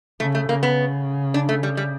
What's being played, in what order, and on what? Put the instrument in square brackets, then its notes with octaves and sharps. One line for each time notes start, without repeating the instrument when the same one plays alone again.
[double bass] C#3 [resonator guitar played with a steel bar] A3
[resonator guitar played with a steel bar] A3
[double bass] C#3 [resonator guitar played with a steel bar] A#3
[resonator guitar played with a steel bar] B3
D4
A3
G3
G3